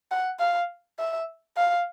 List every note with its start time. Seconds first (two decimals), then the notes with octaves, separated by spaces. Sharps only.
0.11 F#5
0.40 F5
0.99 E5
1.57 F5